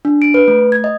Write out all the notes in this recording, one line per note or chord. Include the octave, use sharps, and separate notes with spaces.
D4
D7
B4
A3
G#6
D#5